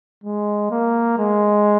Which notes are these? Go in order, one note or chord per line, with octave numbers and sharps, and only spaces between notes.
G#3
A#3
G#3